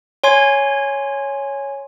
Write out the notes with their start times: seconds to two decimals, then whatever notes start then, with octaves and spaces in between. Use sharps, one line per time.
0.24 C#5 G#5 C6 G#6